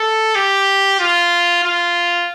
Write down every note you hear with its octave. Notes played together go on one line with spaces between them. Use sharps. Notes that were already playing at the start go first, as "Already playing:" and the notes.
Already playing: A4
G4
F4
F4